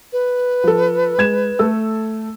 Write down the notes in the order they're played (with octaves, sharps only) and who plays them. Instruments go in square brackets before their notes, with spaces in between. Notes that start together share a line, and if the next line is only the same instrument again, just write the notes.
[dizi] B4
[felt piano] F3 A4
G#3 G#6 E7
A3 A4 E6